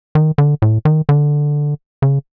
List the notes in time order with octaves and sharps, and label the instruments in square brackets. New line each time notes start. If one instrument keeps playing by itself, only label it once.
[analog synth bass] D#3
D3
A2
D#3
D3
C#3